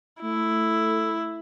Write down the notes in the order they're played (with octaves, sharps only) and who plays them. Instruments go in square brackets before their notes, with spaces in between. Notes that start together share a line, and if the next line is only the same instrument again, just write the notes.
[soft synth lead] A3 [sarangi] E4